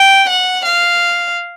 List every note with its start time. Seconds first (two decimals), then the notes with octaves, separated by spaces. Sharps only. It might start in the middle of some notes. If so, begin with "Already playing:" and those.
Already playing: G5
0.29 F#5
0.66 F5